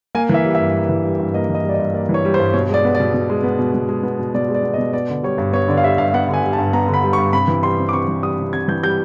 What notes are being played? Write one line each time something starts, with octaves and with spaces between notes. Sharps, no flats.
A#3 G#5
E3 E5
G3
E5
G2
A#3
E3
G3
G2
A#3 D#5
E3
D#5
G3
D5
D#5
G2
A#3 D5
E3
C#5
G3
C5
G2
B2 C#5
G#3 D5
B3
D5
B2
B2
G#3
B3
B2
B2
G#3
B3
B2
B2 D5
G#3
D5
B3
D#5
B2
B3 D5
D3
G3 C#5
G2
B3 C#5
D3 D5
F5
G3 E5
G2 F5
B3 F#5
D3 G#5
G3
A5
G2
B3 A#5
D3
B5
G3
C#6
G2
C3 B5
E3
G3 C6
C3
D6
C3 C#6
E3
G3 D#6
C3
C3 G#6
E3 G6
G3 G6